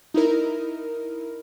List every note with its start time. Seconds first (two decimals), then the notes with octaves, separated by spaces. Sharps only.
0.14 D#4 E4 A#4